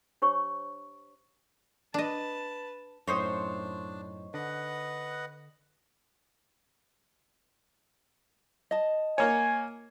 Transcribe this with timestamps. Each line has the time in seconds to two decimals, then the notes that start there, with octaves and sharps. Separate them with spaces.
0.22 D4 G4 C5 C#5 C#6
1.94 D4 B4 D#5 A5
3.08 F#2 A2 D4 D#4 C5 C#5
4.34 D3 B4 D#5 F#5
8.71 D#5 A5
9.18 A#3 C#5 G#5